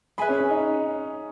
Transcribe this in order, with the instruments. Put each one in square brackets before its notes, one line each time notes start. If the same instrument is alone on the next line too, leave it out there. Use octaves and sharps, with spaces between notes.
[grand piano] G#4 [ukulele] B4 E5 G#5 B5
[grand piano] C#4
C#4
D#4